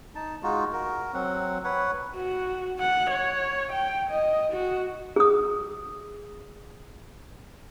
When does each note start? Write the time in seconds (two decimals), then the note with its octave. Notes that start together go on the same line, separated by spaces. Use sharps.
0.15 D#4 A5
0.43 G#3 D#4 F4 F#4
0.73 F#4 A#4
1.14 F#3 C4 F#5
1.64 B4 C#5 F#5
2.16 F#4
2.80 F#5
3.10 C#5
3.72 G5
4.10 D#5
4.52 F#4
5.16 G#4 D#6